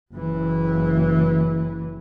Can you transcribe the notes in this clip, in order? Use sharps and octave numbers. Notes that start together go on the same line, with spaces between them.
F#1 E3